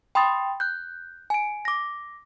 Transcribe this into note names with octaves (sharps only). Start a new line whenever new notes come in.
G5 B5 C6 D#6 A6
F#6 G6
G#5 D7
D6 A#6